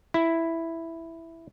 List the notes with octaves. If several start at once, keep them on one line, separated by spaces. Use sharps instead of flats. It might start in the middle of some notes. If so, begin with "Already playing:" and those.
E4